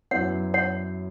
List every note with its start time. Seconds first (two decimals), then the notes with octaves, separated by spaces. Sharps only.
0.11 F#2 F#3 B3 E4 B4 C#5 F#5
0.54 C#5 F#5